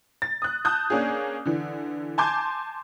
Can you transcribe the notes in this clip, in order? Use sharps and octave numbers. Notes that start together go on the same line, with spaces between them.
A6
D#6 F#6
A5 D#6 F#6 G6
A#3 C#4 D4 G#4
D3 E3
G#5 A5 C6 D6 G6 G#6